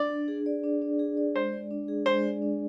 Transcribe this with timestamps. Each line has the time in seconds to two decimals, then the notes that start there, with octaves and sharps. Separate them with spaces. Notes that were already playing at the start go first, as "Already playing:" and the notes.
Already playing: D4 D5
0.10 D4
0.28 G#4
0.46 D5
0.63 D4
0.82 D4
0.99 G#4
1.17 D5
1.35 G#3 C5
1.53 D5
1.71 D4
1.88 G#4
2.06 G#3 C5
2.24 D5
2.42 D4